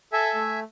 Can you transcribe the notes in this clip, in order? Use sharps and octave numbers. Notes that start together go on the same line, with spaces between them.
A4 E5 G#5
A3